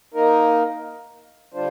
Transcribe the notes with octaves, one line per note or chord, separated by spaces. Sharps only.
A#3 D#4 A#4
D3 G3 D4 F4 C5